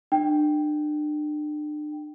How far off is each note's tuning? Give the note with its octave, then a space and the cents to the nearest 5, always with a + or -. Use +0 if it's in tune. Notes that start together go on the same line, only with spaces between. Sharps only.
D4 +35 G5 +0